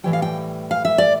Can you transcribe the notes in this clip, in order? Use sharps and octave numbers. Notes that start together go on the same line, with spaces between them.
A2 E3 G3 G5
F5
G5
F5
E5
D5